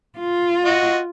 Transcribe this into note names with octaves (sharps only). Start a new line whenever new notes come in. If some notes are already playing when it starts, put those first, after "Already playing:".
F4
F#4 D#5